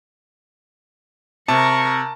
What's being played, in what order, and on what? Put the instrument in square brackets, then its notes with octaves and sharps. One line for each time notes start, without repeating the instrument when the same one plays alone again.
[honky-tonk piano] C3 [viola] A#4 C#6 [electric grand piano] A5